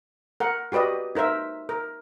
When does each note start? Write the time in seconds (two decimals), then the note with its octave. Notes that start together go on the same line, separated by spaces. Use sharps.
0.40 A#4 F#5
0.72 F#4 G4 B4 D5 D#5
1.15 D#4 A#4 C5 E5
1.69 A#4